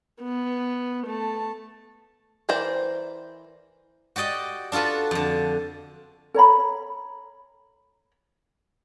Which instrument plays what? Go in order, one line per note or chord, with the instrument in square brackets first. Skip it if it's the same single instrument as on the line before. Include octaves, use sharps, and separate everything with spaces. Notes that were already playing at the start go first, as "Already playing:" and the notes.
[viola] B3
A3 A5
[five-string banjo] E3 A#4 C5 D5 G5
[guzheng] F#4 G4 D5 D#5 G5
D4 F4 F#4 A4 B4
F2 D3
[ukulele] A4 C#5 A#5 B5